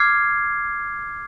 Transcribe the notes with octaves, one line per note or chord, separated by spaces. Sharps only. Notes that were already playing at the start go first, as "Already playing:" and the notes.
Already playing: D6 F6 G#6 C7